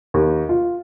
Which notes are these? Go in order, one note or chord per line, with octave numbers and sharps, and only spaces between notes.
D#2
F4